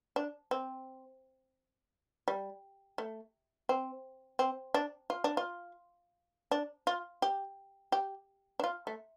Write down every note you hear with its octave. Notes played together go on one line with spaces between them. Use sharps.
D4
C4
G3
A3
C4
C4
D4
F4
D4
F4
D4
F4
G4
G4
D4
F4
A3